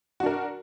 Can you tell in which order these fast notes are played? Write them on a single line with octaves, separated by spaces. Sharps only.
F#4 D4 A#4